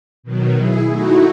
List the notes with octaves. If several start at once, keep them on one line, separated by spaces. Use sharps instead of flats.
B2 D#3 F#3
E4 G#4
A3 D#4 E4 F#4